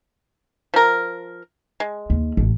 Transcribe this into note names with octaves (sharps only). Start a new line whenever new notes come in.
F3 A#4
G#3
D#2
A1